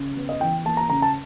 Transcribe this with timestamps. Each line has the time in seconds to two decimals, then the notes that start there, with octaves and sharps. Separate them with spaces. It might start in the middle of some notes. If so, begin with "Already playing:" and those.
Already playing: C#3
0.17 B3
0.29 D#5
0.41 E3 G5
0.65 A#3 A5
0.77 A#5
0.89 C#3 A#5
1.02 A5